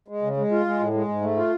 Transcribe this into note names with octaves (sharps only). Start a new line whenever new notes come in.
G#3
C#3
G#3
F4
G#3
A2
G#3
G#2
A3
F4